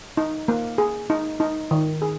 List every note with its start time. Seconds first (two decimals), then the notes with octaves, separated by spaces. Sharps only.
0.17 D#4
0.48 A#3
0.78 G#4
1.10 D#4
1.40 D#4
1.71 D#3
2.02 G#4